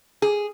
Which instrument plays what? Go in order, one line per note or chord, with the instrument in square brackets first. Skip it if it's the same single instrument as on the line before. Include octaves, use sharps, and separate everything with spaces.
[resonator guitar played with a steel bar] G#4